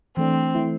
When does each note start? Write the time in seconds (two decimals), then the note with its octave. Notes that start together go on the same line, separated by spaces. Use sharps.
0.17 E3 A3 C4 D4
0.55 E3 A3 E4